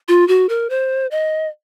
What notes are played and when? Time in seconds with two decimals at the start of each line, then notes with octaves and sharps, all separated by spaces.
0.08 F4
0.28 F#4
0.49 A#4
0.70 C5
1.11 D#5